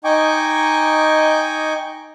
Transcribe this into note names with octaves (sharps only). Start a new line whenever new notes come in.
D#4 D#5 G5 G#5 C#6 D6